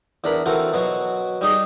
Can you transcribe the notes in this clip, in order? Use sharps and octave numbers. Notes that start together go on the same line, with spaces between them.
E2 D4 A#4 B5
E3 C4 F#4 A4 A#4
B2 F#3 F#4
G3 D#4 G#4